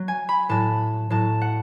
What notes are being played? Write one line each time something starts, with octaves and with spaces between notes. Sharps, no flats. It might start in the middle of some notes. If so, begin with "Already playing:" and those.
Already playing: F#3
G#5
B5
A2 F#3 A5
A2 F#3 A5
F#5